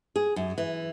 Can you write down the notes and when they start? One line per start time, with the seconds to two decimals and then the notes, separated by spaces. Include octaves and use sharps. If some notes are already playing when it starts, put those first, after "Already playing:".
0.16 G#4
0.36 F#2
0.58 E3